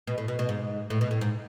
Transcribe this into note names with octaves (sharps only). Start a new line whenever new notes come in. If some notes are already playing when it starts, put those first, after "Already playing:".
B2
A2
B2
B2
G#2
A2
B2
A2
G#2